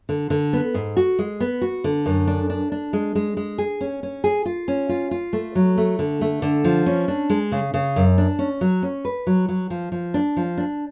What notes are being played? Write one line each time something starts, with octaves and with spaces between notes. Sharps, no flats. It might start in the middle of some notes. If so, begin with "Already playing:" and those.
D3
D3
B3
G#2
F#4
G#3
B3
F#4
D3
F#2
D4
D4
D4
G#3
G#3
G#3
G#4
C#4
C#4
G#4
F4
C#4
F4
F4
A3
F#3
A3
D3
A3
D3
F3
C#4
D4
G#3
C#3
C#3
F#2
D4
C#4
F#3
C#4
B4
F#3
F#3
F3
F3
D4
F3
D4